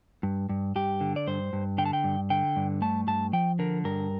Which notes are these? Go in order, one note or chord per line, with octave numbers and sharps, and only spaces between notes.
G2
G2
G2 G4
D3
D5
G2 C5
G2
D3 G5
A5
G5
G2
D3 G5
G2
A3 A5
G2 A5
F3 G5
D3 A#4
G2 A#4